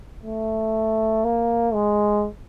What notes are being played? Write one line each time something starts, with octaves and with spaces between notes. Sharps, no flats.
A3
A#3
G#3